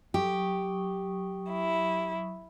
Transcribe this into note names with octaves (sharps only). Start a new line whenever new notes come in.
F#3 G4 C#6 D#6
E4